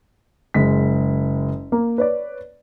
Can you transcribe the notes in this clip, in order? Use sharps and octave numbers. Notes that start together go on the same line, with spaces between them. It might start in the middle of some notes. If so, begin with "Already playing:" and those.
F#1 G#3 B6
A#3
B4 C#5 D5